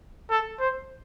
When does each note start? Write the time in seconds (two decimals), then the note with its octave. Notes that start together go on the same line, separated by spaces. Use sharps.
0.30 A4
0.60 C5